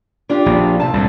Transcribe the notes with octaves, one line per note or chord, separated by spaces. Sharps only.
D4 F4 G4
A#1
C3 A5
C2 A2